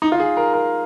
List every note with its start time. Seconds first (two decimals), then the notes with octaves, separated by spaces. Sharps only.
0.02 D#4
0.12 F4
0.20 G#4
0.37 A#4
0.53 A#4